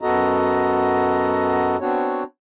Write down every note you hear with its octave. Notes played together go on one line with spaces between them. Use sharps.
F#2 B3 F#4 A4 D#5 A#5
B3 C4 D4 F#4 C#5